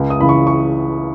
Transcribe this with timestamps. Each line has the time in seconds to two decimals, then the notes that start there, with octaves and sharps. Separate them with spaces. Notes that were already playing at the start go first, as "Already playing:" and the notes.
Already playing: C#2
0.10 D#6
0.20 C#3 E3 B5
0.29 C#6
0.47 C#6